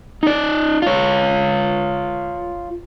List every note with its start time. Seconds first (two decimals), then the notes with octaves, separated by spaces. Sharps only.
0.23 D#4 D5
0.82 F4 C#5